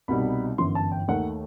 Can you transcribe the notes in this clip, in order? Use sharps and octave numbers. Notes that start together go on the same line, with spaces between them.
C2 B2 G3 D#4 B5
G1 F#2 E3 C6
A5
G5
D#2 D#3 A3 F#5